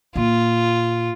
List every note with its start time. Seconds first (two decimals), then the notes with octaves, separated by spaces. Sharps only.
0.16 A#2 F4